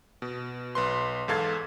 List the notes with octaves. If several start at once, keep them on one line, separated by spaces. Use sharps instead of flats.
B2
B1 B4 C6
E2 G#2 A4 F5 G#6 A6